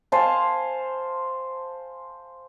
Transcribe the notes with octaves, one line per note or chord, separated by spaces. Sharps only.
C5 F5 G#5 A5